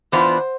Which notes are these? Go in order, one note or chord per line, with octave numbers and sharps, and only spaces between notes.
E3 B3 D4 F4 C5